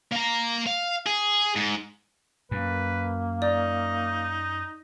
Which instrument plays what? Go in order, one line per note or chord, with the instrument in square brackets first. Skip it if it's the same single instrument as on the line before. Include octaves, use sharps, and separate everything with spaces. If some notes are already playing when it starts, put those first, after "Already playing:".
[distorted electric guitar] A#3 A#5
F5
G#4
G#2
[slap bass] F#2 [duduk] A#3 [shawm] B4
[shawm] D#4 [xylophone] D5